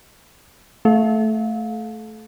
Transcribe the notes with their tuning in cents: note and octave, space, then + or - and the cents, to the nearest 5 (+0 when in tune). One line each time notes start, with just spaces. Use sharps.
A3 +0 A4 -35 F5 +25